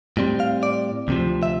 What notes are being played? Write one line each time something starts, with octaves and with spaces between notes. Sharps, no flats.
A2 G3 C4
F5
D5
D2 C3 F3
E5